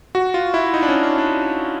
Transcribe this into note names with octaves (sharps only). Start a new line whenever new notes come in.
F#4
F4
E4
D#4
D4
C#4
D4
D4